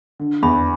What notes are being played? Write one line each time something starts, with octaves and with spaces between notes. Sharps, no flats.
D3
E2 B5